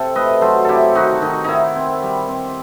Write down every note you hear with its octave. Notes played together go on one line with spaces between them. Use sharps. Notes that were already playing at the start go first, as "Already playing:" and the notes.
Already playing: C3 A4
A3 B4 D#5
F#3 A4 C5
C3 E4 G4 A4
D#3 D#4 F#4
D#3 D#4
D#3 D#4 E4
C4
G3
C4